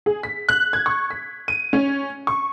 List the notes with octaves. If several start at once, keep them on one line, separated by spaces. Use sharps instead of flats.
G#4
B6
F#6
G#6
C#6
B6
D#7
C#4
C#6